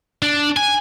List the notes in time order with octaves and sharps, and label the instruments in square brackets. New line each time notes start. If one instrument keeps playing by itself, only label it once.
[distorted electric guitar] D4
G#5